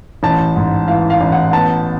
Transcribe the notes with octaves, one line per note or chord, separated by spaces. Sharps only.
A1 A5
G#2
E3 F5
F5
A1
F#5
B3 A5